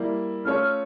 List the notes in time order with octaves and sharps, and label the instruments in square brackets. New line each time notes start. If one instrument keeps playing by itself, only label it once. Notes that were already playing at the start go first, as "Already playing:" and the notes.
Already playing: [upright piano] G3 A#3 E4
[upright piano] A3 C#4 F4 A4 C#5 [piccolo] F6